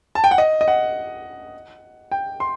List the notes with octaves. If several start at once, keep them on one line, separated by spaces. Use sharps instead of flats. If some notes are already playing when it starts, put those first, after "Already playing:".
A5
G5
F#5
D#5
D#5
F#5
G5
C6